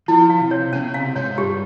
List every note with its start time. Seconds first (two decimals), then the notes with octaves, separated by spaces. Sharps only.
0.08 F3 E4
0.30 F5
0.41 C3
0.51 C#5
0.73 C#3 C#4
0.94 C3 F5
1.16 G#2 C#5
1.37 G2 G4